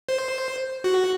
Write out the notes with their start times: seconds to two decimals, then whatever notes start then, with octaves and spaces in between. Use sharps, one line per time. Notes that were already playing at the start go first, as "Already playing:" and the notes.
0.09 C5
0.84 F#4